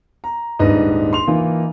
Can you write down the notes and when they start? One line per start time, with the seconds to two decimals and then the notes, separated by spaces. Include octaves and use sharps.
0.24 A#5
0.59 D#1 G#2 D4 B4 D#5
1.13 C6 F7
1.27 E3 A#3 D#4 F4